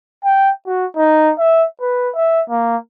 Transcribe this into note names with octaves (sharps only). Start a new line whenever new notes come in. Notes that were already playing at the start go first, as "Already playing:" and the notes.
G5
F#4
D#4
E5
B4
E5
A#3